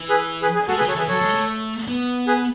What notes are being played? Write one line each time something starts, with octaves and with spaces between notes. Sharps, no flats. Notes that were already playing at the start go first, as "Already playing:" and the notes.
Already playing: E3
G#4 B4
G#4 B4
G#4
G#3 F#4 A4
G#4 B4
F#3
A4 C#5
E3 G#4 B4
F#3 A4 C#5
G#3
A3
B3
G#4 B4